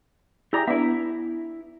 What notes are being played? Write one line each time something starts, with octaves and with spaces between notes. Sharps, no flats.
E4 G4 G#4 D5 A#5
B3 D4 E4 E5